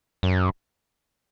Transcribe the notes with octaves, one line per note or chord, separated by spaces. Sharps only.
F#2